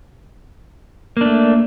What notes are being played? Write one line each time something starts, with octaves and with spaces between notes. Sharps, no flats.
A3 A#3 D4